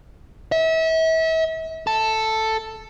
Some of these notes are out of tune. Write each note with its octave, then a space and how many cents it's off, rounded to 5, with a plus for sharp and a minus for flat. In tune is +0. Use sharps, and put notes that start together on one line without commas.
E5 -35
A4 +5